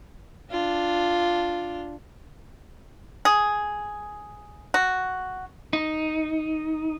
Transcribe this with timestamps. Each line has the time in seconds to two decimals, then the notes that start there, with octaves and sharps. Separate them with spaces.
0.51 D4 F4
3.25 G#4
4.74 F#4
5.73 D#4